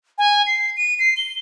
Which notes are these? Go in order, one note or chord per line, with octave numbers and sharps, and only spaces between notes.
G#5
C7
D#7
C7
G7